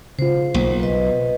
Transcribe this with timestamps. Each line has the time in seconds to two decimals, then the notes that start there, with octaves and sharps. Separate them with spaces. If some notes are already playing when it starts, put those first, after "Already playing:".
0.19 C#3 F4 C5
0.54 B1 A#3
0.80 B4 D#5